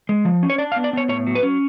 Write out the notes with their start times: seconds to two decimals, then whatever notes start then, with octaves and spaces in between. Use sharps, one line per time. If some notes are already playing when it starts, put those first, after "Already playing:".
0.09 G#3
0.25 F3
0.43 C#4
0.50 C#5
0.58 D4 D5
0.72 F5
0.76 B3
0.84 D5
0.93 B3 C#5
1.09 A2 C#5
1.27 F#3
1.35 B4
1.43 C#4